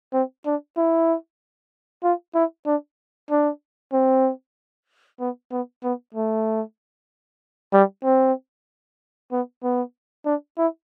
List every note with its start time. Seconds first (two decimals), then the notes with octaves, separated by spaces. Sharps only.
0.13 C4
0.46 D4
0.77 E4
2.04 F4
2.35 E4
2.66 D4
3.30 D4
3.93 C4
5.20 B3
5.52 B3
5.84 B3
6.14 A3
7.73 G3
8.04 C4
9.32 B3
9.63 B3
10.25 D4
10.58 E4